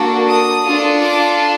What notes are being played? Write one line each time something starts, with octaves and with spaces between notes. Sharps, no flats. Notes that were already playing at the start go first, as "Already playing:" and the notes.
Already playing: A#3 D4 F#4 A4
D#6
D4 F4 A4
D6